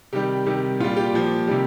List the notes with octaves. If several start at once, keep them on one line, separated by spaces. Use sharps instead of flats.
C3 D#3 G3 G4
C3 D#3 G3
A#2 G3 F4
G4
A#2 F3
C3 D#3 G3